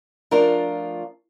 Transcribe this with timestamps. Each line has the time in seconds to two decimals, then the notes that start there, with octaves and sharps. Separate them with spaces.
0.31 F3 A3 D4 F4 A#4